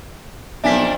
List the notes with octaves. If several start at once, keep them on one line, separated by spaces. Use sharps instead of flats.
B1 F2 A#3 D4 E5 G#5 B6